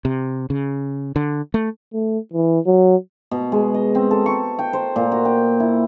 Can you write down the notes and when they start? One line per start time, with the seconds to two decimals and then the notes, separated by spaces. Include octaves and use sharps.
0.05 C3
0.50 C#3
1.16 D3
1.54 A3
1.93 A3
2.33 E3
2.66 F#3
3.31 B2
3.52 G#3
3.74 D#5
3.95 C4
4.11 A4
4.26 C#6
4.59 G5
4.73 C5
4.96 A#2
5.12 F#4
5.25 G5
5.60 E4